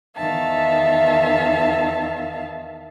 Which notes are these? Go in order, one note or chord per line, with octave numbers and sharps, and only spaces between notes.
E2 D#3 E5 F5 A5